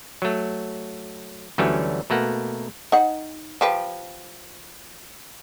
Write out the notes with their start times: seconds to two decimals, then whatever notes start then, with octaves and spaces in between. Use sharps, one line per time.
0.22 F#3 A3
1.58 D2 E3 F#3 G3 A3 C#4
2.10 B2 A3 A#3 F#5
2.92 D#4 F#5
3.61 F3 G4 B4